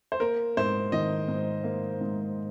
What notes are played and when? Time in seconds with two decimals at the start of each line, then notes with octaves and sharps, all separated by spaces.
0.12 C5
0.20 A#3 A#4
0.57 G#2 C5
0.92 D#3 D#5
1.28 G#2
1.64 A#3
2.01 G#2